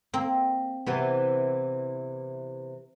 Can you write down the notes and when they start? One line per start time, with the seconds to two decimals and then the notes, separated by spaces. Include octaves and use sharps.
0.14 A#3 C4
0.86 C3 E3 B3